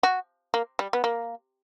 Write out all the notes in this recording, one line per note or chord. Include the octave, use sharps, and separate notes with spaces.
F#4
A#3
G3
B3
A#3